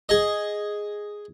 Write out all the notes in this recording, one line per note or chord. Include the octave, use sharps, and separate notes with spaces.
G#4 D#5